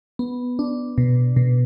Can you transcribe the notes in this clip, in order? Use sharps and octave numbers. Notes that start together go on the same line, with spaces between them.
B3
D4
B2
B2